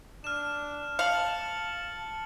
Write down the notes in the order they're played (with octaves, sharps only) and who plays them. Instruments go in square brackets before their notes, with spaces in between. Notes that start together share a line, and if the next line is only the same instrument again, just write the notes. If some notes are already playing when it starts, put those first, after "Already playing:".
[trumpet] D4 [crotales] F6 E7
[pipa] F5 [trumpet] A5 [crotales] C#7 F#7